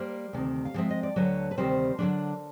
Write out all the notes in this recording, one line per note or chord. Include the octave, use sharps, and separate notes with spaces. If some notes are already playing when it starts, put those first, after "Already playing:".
Already playing: G3 A#3 A#4 C5
D2 C3 D#3
F5
D3 F3 G#3 C4 E5
D#5
D5
D2 D3 F#3 B4 C#5
B4
D2 C3 D#3 G3 C4 A#4 C5
D3 F#3 A3 D4